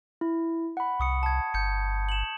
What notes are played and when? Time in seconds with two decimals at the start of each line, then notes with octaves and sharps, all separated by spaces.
0.21 E4
0.77 F#5 B5
1.00 C2 C#6 D#6 C#7
1.23 A5 G#6
1.54 G1 G6 C#7
2.09 E7 F#7